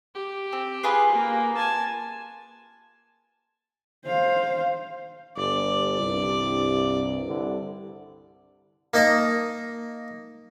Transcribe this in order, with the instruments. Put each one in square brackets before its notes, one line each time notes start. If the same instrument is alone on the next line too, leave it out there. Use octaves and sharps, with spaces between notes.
[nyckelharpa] G4
[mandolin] C4
F4 G#4 B4
[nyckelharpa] A#3
G#5 A5
[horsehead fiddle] C5 F5
[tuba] G1 [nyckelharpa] D5
[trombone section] C2 [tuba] G2
[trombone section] C2 D3
[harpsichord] A#3 D#4 D#5 A5